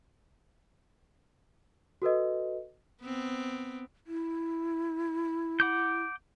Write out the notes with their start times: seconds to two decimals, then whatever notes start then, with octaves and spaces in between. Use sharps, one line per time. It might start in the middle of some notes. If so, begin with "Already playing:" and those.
2.02 F#4 A4 B4 D#5
3.02 B3 C4
4.07 E4
5.60 F#5 D6 G6